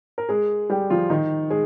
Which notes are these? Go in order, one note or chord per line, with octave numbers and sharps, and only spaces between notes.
A#4
G#3 G#4
G3 G4
F3 F4
D#3 D#4
G#3 G#4